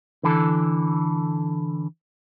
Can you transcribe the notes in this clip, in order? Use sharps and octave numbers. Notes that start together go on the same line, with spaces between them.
D3 E3 A4